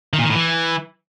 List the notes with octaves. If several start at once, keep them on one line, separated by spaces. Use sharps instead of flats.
D#3
A#2
D#3
A2
E3